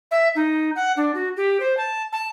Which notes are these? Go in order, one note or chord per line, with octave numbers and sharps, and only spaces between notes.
E5
D#4
F#5
D4
F#4
G4
C5
A5
A5